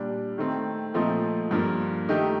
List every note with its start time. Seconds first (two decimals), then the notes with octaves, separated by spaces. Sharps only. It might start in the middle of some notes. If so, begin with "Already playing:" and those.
Already playing: A#2 G3 D4
0.38 D#3 A3 C4
0.94 A#2 F3 A3 C4 D#4
1.51 G2 F3 A#3 F4
2.09 D#3 A3 D#4 G4